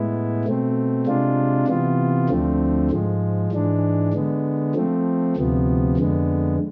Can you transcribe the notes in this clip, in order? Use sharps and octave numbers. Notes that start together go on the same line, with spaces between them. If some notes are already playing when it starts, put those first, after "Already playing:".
Already playing: A2 G#3 B3 E4
B2 A3 C4
C3 G#3 D4 F4
C3 E3 B3 F4
D2 D3 F3 A3 C4
G#2 F3 G#3
G#2 E3 G#3 D4
D3 G#3 B3
F3 A3 C4
D2 C3 F3 B3
F2 D3 G#3 B3